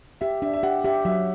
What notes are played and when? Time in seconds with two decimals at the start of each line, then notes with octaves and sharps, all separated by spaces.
0.21 G4 E5
0.42 D4 E5
0.54 E5
0.63 G4 F#5
0.84 G4 E5
1.05 F#3 E5